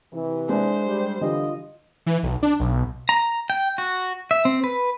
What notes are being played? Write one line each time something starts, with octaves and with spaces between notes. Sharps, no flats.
C3 E3
G#3 D4 E4 C5
G3
D3 E3 G3 F4 D#5
E3
B1
D4
B1
A#5
G5
F#4
E5
C4
B4